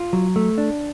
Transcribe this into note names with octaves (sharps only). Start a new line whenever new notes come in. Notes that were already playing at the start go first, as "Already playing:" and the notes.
Already playing: F4
F#3
A3
D4